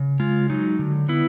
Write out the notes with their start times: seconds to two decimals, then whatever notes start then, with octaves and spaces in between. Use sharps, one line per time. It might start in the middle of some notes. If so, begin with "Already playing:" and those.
Already playing: C#3
0.20 G#3 F4
0.50 F#3 D#4
0.79 D3
1.09 B3 E4